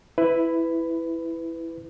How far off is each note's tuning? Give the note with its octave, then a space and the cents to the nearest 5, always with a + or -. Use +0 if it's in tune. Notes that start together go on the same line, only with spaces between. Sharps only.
E4 +0 B4 +15